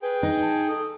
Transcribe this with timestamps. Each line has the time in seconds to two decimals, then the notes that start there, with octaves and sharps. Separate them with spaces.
0.02 G#4 B4 G5
0.23 D#4
0.42 A5
0.68 A4 D#6